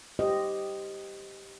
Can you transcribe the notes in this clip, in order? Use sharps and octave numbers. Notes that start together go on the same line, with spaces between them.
G4 C5 D#5